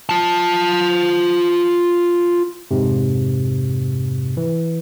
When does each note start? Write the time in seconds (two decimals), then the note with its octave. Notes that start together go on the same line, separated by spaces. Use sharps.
0.09 F4 A5
2.71 F2 G#2 C3
4.37 E3